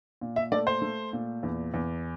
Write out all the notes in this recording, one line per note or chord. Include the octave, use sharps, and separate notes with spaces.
A#2
E5
A3 D5
C5
A3
A#2
E2
E2